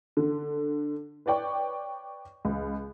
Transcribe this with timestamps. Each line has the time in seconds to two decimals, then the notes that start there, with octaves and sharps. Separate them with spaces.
0.17 D3
1.26 B4 C#5 D5 G5 C#6
2.45 C#2